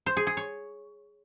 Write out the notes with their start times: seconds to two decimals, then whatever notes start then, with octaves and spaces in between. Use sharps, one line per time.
0.06 C5
0.17 G#4
0.27 G#4
0.37 C#5